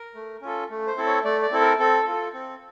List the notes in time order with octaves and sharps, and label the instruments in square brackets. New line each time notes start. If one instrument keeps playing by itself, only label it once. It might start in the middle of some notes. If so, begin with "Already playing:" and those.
Already playing: [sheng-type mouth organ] A#4
A3
C#4 F4 A4
A3
C5
C4 E4 A4
C#5
A3 D5
D5
C4 E4 A4
A#4
C4 A4
F4 A4
C4